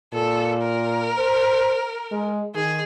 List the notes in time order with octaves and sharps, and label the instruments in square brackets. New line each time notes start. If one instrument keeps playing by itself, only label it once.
[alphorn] A#2 [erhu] A4
[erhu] A#4
[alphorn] C5
G#3
[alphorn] D#3 [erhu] G#4